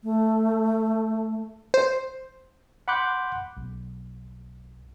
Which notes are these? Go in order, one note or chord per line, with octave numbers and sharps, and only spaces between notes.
A3
C5
F#5 B5 C6 D6 F#6 G6
B1